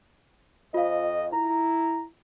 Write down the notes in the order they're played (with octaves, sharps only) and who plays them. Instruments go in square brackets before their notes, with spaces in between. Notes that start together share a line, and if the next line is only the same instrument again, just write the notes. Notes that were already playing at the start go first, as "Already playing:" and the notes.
[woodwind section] F2 [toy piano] F4 F5 [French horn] D#5
[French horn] E4 [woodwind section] A#5